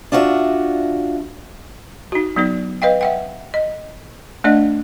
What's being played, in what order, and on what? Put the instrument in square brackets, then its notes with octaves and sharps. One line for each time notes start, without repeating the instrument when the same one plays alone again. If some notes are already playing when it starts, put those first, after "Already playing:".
[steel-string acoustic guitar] D4 F4 F#4 B4 E5
[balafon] D#4 F#4
F#3 B3 D#4 D5
B4 D#5 F5 G5
E5 F#5 G5
D#5
A3 D4 D5 D#5 F#5